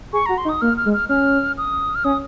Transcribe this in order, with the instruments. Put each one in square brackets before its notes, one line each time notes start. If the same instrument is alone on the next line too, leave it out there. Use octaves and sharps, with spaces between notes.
[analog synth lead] G#4 [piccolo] C#6
[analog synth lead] F#4 [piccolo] A#5
[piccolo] C6
[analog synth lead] D#4
[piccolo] D#6
[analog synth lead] A#3 [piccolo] F6
[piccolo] F6
[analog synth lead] G#3
[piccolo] F6
[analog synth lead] C#4 [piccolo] F6
[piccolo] D#6
F6
[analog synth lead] C#4 [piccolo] D#6